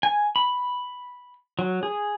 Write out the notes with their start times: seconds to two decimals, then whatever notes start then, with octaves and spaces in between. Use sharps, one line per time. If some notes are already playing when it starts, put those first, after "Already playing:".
0.03 G#5
0.36 B5
1.59 F#3
1.83 G#4